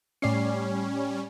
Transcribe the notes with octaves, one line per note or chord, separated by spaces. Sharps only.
A2 G3 C#4 D5 C7